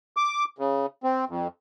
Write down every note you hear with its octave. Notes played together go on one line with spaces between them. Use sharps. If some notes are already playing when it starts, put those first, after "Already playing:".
D6
C#3
C4
F2